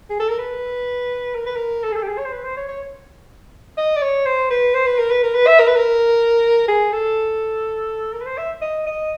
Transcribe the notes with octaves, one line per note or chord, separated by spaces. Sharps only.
G#4
A4
A#4
B4
A#4
B4
A#4
A4
G#4
A4
G4
G#4
C#5
C5
B4
C5
C#5
C#5
D#5
D5
C#5
C5
B4
C5
B4
A#4
B4
A#4
B4
E5
A#4
B4
A#4
G#4
A4
A#4
B4
C5
E5
D#5
D#5